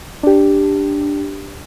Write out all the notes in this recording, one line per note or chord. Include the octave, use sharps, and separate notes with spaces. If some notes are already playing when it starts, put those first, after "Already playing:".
D4 G4